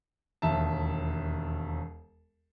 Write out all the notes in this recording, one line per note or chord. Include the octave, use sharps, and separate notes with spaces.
E1 D#2 E5 A5